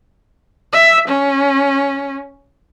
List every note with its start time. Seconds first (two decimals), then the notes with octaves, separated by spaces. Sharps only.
0.72 E5
1.08 C#4